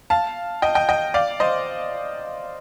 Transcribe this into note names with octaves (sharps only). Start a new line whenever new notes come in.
F5 A5
D#5 G5
D#5 G5
D#5 G5
D5 F5
C5 D#5